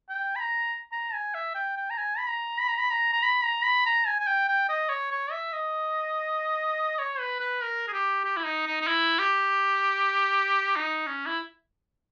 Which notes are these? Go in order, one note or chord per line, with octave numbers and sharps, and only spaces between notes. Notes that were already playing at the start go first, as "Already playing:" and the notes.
G5
B5
A#5
A#5
G#5
E5
G5
G5
A#5
G#5
B5
A#5
B5
A#5
B5
A#5
A#5
B5
A#5
B5
A#5
G#5
G#5
G5
G5
D#5
C#5
C#5
E5
D#5
C#5
B4
B4
A#4
G#4
G4
G4
E4
D#4
D#4
D#4
E4
G4
D#4
C#4
E4